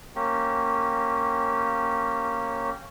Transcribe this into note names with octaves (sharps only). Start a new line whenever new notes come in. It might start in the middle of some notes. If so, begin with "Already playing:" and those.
A#3 C#4 G4